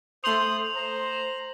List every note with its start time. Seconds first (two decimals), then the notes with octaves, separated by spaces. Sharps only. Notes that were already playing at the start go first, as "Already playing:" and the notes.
0.24 A3 C5 C6 D#6 F7 F#7
0.76 C5 A#5